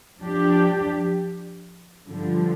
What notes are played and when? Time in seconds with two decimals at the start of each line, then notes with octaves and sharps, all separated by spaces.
0.18 F3 D4 G4
2.07 G2 D3 F3